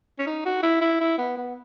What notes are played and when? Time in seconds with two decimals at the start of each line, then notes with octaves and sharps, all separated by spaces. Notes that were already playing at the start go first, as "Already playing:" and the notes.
0.19 C#4
0.26 D#4
0.45 F#4
0.63 E4
0.81 E4
1.00 E4
1.18 B3
1.37 B3